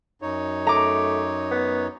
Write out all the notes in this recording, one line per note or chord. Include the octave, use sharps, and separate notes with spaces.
F#2 D#4 C#5
A3 A#5 D6
B3